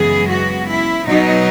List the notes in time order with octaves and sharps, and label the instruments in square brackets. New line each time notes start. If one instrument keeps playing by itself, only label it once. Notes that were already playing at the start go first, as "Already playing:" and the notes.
Already playing: [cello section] F#2 C#3 E3 G#3 B3 G#4
F#4
E4
B2 F#3 B3 D#4